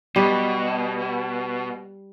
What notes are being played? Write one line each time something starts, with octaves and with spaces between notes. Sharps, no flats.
B2 G3